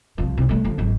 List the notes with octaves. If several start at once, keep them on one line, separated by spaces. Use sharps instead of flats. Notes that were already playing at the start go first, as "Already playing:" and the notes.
C2 F3
C3
G3 A3
D3 F3
G#1 F#3